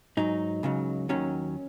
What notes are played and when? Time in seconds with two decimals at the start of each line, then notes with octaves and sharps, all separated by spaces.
0.17 G#2 F#3 D#4
0.63 C#2 C#3 F#3
1.09 D#2 D#3 F#3 C#4